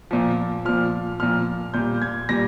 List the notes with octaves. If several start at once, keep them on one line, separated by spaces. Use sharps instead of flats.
A#2 F3
A#2 F3 F6
A#2 F3 F6
A#2 G3 G6
G#6
A#2 G3 A#6